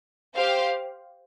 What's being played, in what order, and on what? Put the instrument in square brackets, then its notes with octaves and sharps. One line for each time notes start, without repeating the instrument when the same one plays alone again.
[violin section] G4 C5 F5